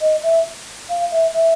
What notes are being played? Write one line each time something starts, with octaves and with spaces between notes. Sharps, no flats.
D#5
E5
F5
E5
E5